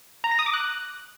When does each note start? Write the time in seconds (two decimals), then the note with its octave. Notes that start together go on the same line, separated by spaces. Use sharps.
0.24 A#5
0.31 A#6
0.39 D#6
0.46 D6
0.54 F#6